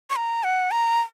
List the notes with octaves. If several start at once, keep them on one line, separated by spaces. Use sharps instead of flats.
C#6
A#5
F#5
A#5